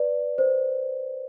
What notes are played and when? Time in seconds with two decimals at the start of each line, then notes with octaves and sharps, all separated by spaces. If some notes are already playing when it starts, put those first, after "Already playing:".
Already playing: B4 D5
0.38 C5